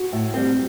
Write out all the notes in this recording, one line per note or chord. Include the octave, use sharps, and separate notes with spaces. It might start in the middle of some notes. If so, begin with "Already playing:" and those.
Already playing: F#4
A2
G3 C4